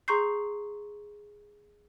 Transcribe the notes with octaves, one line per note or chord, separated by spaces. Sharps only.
G#4 A#5 C6 C#6 G6 C7